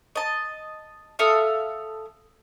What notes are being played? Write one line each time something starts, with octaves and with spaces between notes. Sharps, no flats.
D#5 A5
A4 E5 F5 D#6